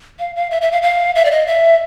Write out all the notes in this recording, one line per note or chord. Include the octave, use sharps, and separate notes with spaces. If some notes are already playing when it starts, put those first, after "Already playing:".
F5
F5
E5
E5
F5
F5
E5
D5
D#5
E5